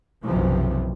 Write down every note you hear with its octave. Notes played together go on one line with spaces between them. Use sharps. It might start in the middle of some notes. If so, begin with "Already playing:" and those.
F#1 B1 C3 E3 F3